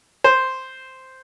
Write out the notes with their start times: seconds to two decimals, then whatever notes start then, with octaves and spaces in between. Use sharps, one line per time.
0.24 C5